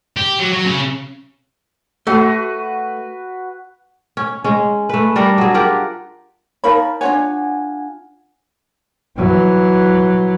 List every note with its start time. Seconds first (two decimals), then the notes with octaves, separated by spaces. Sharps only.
0.17 G4
0.40 F#3
0.53 F#3
0.66 C#3
2.07 A3 F#4 B4
4.17 C#4
4.44 G#3 C#4
4.89 A3 B4
5.16 G3 D4 A#4
5.38 F#3 G#4
5.54 F4 G4 A#4 F#5
6.64 D#4 A#4 C#5 F5 A5 B5
7.01 D4 F4 C#5 F#5 G#5
9.17 E3 F#3